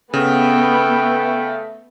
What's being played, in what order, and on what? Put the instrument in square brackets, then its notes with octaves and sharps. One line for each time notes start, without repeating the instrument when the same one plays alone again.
[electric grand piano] C#3 [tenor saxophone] A3 [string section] B3 [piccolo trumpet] G5